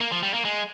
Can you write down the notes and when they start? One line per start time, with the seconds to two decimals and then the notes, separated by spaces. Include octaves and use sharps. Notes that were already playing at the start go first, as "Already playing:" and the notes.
0.01 A#3
0.12 F3
0.23 G3
0.34 A#3
0.45 G#3